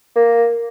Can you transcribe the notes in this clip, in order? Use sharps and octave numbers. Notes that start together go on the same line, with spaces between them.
A#3